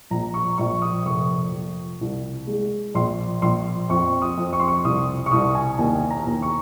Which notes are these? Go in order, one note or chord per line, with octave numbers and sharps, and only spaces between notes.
A#1 A#5
C#6
A#1 C#6
D#6
F1 C#6
F3
C2
G#3
A#1 C6
A#1 C6
F2 C#6
D#6
F2
C#6
C6
C#6
C2 D#6
C#6
C2 D#6
G#5
D#2 G#5
A#5
D#2
C#6